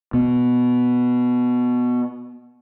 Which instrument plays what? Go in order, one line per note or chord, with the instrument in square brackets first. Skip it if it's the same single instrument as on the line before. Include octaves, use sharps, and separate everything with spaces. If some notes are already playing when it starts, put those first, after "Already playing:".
[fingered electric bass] B2 B3